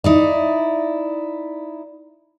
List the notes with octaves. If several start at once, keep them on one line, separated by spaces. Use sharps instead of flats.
D#4 E4 D5